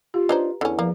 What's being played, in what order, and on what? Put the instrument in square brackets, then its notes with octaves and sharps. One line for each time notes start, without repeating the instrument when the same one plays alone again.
[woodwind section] F4 [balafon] G4
[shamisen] D4 D#4 C5 [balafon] B4 A#5
[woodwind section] E2 [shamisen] D3 C#4
[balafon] F3 [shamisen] A#3